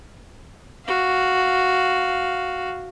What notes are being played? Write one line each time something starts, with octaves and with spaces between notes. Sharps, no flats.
F#4 F5